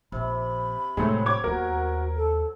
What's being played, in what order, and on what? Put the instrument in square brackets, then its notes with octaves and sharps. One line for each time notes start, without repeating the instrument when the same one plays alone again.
[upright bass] A#1 [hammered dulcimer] C3 [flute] B5
[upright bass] F1 A2 [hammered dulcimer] F#3 C4 [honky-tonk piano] G#3 A3
[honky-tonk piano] C#5 D6 G#6
[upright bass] D#2 B3 [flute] F#4 [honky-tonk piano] A#4
[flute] A4